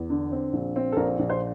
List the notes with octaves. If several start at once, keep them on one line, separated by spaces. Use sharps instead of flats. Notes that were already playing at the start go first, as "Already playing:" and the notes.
Already playing: E2
D3
C4
A#1
C4
A4
A#1 A#4
A#1
C5